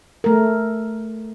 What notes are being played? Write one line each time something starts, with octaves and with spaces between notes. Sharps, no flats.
A3 A#4